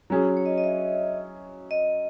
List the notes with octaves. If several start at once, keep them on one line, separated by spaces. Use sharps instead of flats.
F#3 C#4 G#4
C#5
D#5
D#5
E5
D#5